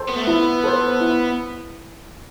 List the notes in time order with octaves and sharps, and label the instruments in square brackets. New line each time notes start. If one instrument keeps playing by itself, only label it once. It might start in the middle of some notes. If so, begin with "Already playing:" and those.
Already playing: [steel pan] A4 C5
[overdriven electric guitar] B3
A3
[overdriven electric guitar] B3 [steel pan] E4
[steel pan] A4 C5
E4